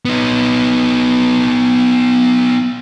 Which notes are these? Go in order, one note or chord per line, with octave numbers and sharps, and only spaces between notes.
B3 D#4